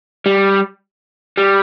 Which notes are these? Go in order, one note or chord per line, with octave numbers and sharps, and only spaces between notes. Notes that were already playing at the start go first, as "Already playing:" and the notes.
G3
G3